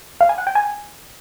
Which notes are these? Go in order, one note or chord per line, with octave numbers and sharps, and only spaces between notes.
F5
G#5
F#5
G5
G#5